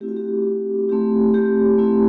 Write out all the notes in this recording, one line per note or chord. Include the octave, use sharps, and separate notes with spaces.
A3 C4 E4 G4
F#4
G4
A3 C4 E4 G4
G4
A3 C4 E4